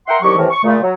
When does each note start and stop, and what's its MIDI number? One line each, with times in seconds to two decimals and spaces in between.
0.07 0.15 70
0.07 0.15 76
0.07 0.15 78
0.07 0.15 79
0.07 0.15 84
0.21 0.36 36
0.21 0.36 51
0.21 0.36 54
0.21 0.36 67
0.21 0.36 85
0.36 0.45 45
0.36 0.45 48
0.36 0.45 51
0.36 0.45 52
0.50 0.62 85
0.63 0.76 46
0.63 0.76 49
0.63 0.76 57
0.82 0.93 54